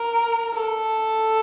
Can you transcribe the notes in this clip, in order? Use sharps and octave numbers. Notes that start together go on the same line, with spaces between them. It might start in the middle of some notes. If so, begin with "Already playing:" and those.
Already playing: A#4
A4